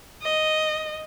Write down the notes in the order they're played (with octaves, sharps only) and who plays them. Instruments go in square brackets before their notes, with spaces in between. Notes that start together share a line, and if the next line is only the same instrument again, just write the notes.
[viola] D#5